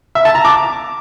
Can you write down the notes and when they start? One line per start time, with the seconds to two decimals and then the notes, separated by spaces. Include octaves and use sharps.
0.15 E5
0.25 A5
0.35 A#5
0.45 D6